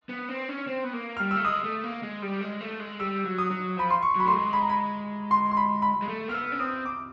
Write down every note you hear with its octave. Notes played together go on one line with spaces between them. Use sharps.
B3
C4
C#4
C4
B3
A#3
G3 F6
A3 E6
G#3 D#6
A3
A#3
G#3
G3
G#3
A3
G#3
G3 E6
F#3
D#6
F#3
F3 B5
C6
C#6
F#3 B5
A3 C6
G#3
B5
A#5
B5
C6
C6
B5
B5
G#3
A3
A#3 F6
B3 E6
C#4
C4 D#6
D6